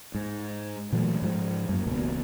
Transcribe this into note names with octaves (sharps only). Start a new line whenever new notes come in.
G#2
A#2 E3 F#3 A3
G#2 F3 G#3
F#2 A#3
E1 C#2 B2 A#3